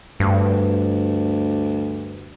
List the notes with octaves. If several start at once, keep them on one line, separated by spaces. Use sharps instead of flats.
D2 G2